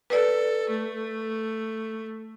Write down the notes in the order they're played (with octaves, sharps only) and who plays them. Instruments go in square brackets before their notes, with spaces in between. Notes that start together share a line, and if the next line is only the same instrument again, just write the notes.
[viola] A4 [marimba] B4 D5
[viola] A3